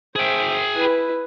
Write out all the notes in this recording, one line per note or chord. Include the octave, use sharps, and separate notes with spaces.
G#4 C5 E5 G5
E4 B4